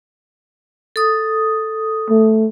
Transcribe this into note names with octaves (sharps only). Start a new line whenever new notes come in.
A4 D#6
A3